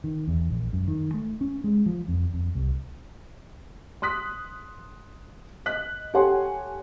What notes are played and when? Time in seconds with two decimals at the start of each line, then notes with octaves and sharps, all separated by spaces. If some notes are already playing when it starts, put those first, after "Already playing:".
0.04 D#3
0.28 E2
0.50 A#1
0.73 F#2
0.88 D#3
1.14 A3
1.41 C#4
1.64 G#3
1.86 F3
2.08 F2
2.34 F2
2.55 C2
4.02 C6 D#6 F#6 B6
5.66 D#5 F#6 B6
6.14 G4 A4 C#5 F#5 G#5 C6